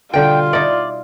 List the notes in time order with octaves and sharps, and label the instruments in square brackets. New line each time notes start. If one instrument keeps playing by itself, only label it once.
[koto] B2 D3 G3 [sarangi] F4 [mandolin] G5
[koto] D#4 E4 [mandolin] D5